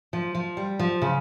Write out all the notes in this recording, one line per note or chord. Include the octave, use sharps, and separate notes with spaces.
F3
F3
G3
F3
C#3